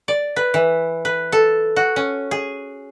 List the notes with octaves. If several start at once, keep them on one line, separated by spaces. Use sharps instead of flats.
D5
B4
E3
B4
A4
F#4
C#4
G#4